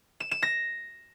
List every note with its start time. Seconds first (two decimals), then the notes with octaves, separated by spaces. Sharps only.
0.20 E7
0.31 E7
0.42 A#6